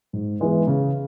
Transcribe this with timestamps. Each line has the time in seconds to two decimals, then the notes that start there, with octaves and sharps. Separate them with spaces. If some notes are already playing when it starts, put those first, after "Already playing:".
0.13 G#2
0.40 E3 G#3 B3
0.67 C#3